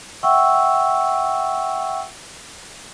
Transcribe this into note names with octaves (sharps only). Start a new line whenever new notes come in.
E5 F#5 G5 C#6 E6